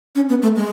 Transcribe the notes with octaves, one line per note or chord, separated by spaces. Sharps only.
C#4
B3
A3
G#3